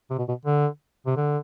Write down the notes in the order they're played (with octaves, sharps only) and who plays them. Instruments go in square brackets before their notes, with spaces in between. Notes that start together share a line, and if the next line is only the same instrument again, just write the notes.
[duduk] C3
B2
B2
D3
C3
D3